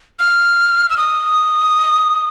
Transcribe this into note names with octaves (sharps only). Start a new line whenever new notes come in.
F6
E6
D#6